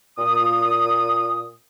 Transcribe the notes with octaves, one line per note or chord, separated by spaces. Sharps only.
A#2 D#6